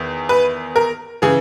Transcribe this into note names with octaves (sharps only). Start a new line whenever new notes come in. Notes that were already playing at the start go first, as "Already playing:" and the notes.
Already playing: E2 D#3
B4
A#4
C#3 E3 G#4